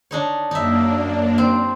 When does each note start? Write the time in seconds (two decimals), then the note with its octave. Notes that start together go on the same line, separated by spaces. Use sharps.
0.11 D4 D#4 C#5
0.51 F#2 A#3 D4 D#4 E5
1.38 C4